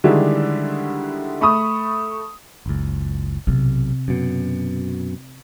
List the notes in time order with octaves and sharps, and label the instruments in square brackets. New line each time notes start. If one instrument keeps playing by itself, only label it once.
[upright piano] D3 D#3 G3 G#3 D4 E4
A3 B5 C#6 D#6
[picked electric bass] F#1 C#2
[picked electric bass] B1 [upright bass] C3
[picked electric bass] F#2 B2